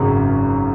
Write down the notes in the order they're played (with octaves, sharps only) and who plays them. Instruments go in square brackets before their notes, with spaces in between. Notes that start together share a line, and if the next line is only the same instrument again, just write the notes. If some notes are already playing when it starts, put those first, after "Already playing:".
Already playing: [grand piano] G#1 F#2 C#3